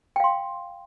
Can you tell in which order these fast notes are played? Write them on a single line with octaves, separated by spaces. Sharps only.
G5 F5 C6